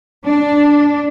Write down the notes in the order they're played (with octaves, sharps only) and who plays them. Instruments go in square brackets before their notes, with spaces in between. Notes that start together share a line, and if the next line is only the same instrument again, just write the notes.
[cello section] D4